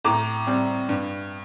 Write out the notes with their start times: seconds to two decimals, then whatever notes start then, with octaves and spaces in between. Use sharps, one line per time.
0.05 A2 A#5 D6
0.47 G3 C4
0.89 G2